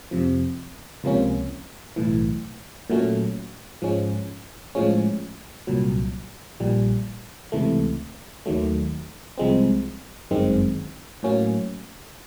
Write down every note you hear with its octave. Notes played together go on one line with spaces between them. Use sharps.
F2 C3 F3
C#2 C3 F3 A#3 C#4
B1 A2 E3
A#2 F#3 A3 C#4
G#2 F3 G#3 C#4
A2 F3 G#3 C#4
C2 A#2 F#3
A#1 A#2 G3
C#2 C3 E3 A3
D#2 D#3 F#3 A3
C2 C3 F3 G#3 C4
G1 F#2 D#3 G#3 C4
A2 F#3 A#3 C#4